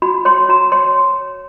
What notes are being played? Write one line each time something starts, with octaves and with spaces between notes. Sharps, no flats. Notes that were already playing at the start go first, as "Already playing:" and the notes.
F#4 B5
C#5 C6
F#4 A#5
C#5 C6